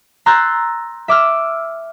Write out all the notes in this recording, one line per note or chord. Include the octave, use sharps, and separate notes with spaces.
A#5 C6 E6 F#6 G6 A6
E5 D6 E6 F6